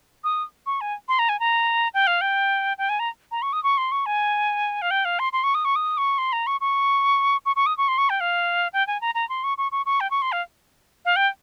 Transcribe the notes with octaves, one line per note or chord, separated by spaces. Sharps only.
D#6
C#6
G#5
C6
A#5
G#5
A#5
G5
F5
G5
G5
G#5
A#5
A#5
C#6
D#6
C#6
C6
C#6
G#5
F5
G5
F5
C6
C6
C#6
D#6
C#6
D#6
C#6
C6
A#5
C#6
C#6
C#6
C#6
D#6
C#6
C6
C#6
G5
F5
G5
G#5
A#5
A#5
C6
C#6
C#6
C#6
C#6
G5
C#6
C6
F5
F5
G5